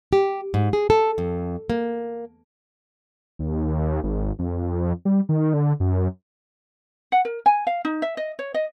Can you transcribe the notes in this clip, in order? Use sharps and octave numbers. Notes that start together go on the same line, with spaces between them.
G4
G#2
G#4
A4
F2
A#3
D#2
G#1
F2
G3
D#3
D3
F#2
F#5
A#4
G#5
F5
D#4
E5
D#5
C#5
D#5